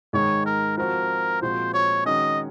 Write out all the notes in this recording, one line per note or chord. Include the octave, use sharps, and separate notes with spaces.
G#2 D#3 G#3 C#5
A#4
F3 C4 F#4 A#4
A#2 F3 G#3 C4 F#4 C5
C#5
D#3 G#3 C#4 F#4 D#5